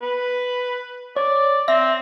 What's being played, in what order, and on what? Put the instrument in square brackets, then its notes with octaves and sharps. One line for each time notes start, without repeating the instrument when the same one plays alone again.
[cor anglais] B4
[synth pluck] C#5 [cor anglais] D5
[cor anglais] C4 [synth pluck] E5 A#6